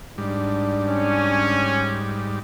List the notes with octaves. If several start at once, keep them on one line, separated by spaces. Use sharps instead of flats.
G#2 G3 D4
C#4